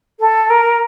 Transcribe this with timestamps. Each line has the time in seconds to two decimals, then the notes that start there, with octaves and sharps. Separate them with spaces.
0.20 A4
0.50 A#4